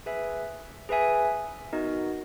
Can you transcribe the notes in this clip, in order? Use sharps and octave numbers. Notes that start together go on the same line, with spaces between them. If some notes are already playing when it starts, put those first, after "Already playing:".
G#4 B4 E5 G#5
G#4 B4 E5 G#5
B3 D#4 F#4 A#4 D#5